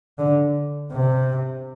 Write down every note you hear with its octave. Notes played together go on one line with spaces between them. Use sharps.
D3
C3